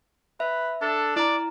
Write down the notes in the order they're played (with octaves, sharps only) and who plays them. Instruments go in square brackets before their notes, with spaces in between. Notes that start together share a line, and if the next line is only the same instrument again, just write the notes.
[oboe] B4 [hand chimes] E5
[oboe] D4 [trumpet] A4
[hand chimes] E4 A#5 [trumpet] D5